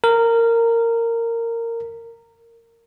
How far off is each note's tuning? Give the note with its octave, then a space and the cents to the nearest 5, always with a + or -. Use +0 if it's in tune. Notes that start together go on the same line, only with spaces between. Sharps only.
A#4 -15